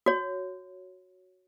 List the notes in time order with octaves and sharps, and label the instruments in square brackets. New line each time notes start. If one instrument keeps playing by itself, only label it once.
[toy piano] F#4 C#5